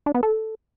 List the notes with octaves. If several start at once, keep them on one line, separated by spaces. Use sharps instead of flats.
D4
B3
A4